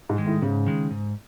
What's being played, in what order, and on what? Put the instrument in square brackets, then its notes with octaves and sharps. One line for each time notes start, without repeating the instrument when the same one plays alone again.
[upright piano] G#2
[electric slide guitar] D#3 G#3
[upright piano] A2
[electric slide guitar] G#2 [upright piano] C#3
[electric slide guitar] D#3 G#3
G#2